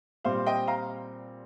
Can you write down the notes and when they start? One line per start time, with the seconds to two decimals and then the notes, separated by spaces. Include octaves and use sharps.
0.25 A#2 G3 C4 C5 F5
0.46 D#5 G5
0.68 F5 A#5